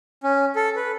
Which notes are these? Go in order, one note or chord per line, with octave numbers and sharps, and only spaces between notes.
C#4
A4
B4